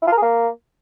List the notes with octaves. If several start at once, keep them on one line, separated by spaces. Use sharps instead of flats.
E4
F4
A#4
G#4
A#3